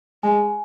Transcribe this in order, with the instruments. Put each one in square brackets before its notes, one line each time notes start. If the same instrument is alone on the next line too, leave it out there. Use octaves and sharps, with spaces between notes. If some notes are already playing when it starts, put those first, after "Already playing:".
[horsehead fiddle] G#3 [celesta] G#5